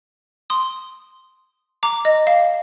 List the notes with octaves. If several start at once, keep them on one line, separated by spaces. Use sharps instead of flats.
C6 D#6
A#5 D6
D#5
F5